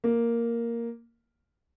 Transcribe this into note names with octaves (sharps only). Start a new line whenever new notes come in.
A#3